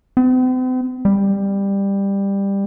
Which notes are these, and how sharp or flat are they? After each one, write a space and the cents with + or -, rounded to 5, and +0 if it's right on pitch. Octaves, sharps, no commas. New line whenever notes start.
C4 -45
G3 +15